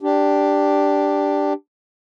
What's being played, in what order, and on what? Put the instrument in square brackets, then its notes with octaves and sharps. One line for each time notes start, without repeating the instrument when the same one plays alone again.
[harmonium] D4 G4